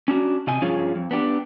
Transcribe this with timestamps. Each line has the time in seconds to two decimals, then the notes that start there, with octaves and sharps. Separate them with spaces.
0.08 C#4 D4 F#4
0.47 C3 D#5 G#5
0.61 G2 F3 C#4 F4 G#4 C#5
0.95 F2
1.11 B3 D4 G4